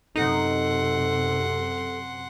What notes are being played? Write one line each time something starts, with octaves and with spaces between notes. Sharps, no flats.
F#2 C3 D#4 A4 F#5 C6